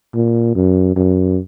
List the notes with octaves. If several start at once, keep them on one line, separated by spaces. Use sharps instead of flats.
A#2
F#2
F#2